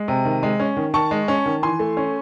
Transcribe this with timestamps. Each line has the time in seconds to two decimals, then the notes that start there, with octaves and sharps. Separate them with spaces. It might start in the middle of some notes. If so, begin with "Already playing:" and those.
Already playing: G#3
0.08 C3
0.25 D#3
0.43 G#3
0.60 C#4
0.77 D#3
0.94 D#3 A5 C#6
1.11 G#3
1.28 C#4
1.46 D#3
1.63 E3 G#5 C6
1.79 A3
1.97 C#4